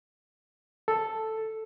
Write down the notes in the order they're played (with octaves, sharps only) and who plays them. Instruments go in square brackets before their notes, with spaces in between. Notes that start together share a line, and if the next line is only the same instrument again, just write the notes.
[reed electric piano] A4